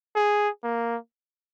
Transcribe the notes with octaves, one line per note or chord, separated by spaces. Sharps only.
G#4
A#3